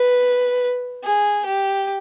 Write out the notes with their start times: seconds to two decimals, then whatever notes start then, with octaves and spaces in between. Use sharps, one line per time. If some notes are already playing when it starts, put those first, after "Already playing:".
Already playing: B4
1.03 G#4
1.46 G4